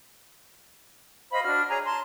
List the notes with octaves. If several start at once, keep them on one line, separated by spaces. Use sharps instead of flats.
C5 D#5 F5 B5
D4 F#4 F6
G#4 C#5 G#5 A#5
A5 A#5 C6